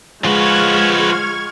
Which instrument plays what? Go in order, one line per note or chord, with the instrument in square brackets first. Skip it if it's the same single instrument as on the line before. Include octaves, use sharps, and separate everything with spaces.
[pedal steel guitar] F3 F#4 [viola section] G#3 [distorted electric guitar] F4 B4 [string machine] C#6 F6 G#6